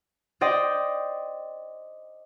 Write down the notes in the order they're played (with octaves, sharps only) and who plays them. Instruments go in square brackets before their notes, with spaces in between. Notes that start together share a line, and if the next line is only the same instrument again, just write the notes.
[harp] C5 D5 D#5 G5